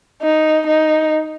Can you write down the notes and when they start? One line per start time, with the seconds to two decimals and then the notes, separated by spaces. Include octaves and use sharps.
0.22 D#4
0.67 D#4